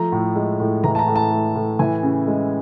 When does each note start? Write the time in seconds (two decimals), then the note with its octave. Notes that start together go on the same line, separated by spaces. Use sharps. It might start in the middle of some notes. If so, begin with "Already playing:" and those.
Already playing: F3 A3 A#5
0.12 A2
0.36 G#3
0.60 A2
0.84 E3 A#5
0.95 A5
0.99 A#5
1.07 A2
1.16 A5
1.31 A3
1.55 A2
1.79 E3 G#5
2.03 C#3
2.27 G#3